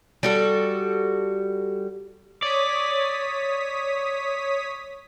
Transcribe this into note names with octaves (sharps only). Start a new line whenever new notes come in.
G3 F#4 A4
C#5 D5 D#6 B6